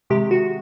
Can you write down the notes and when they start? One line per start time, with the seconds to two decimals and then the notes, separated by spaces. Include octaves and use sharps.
0.10 C3 D#3 G#3 G4
0.31 F#4